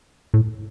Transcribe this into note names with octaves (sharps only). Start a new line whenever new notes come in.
A2